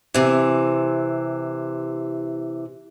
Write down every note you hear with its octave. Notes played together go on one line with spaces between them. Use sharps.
C3 E3